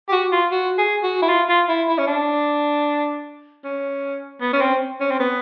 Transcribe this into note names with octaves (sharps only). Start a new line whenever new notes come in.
G4
F#4
F4
F#4
G#4
F#4
E4
F4
F4
E4
E4
C#4
D4
C#4
B3
C#4
C4
C#4
C4
B3